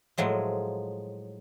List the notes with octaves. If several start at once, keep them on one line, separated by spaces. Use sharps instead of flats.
A2 F3 F#3 G#3